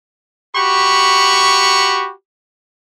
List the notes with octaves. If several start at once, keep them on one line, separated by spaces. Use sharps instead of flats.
F#4 G4 B5 C#6